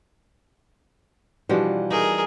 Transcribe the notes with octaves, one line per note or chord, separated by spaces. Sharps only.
B2 E3 F3 G3 D4 F#4
A3 D#4 G#4 A#4